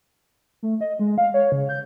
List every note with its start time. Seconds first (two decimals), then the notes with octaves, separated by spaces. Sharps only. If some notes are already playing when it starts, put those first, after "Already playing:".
0.63 A3
0.81 D#5
0.99 G#3
1.18 F5
1.34 C#5
1.52 C#3
1.69 G6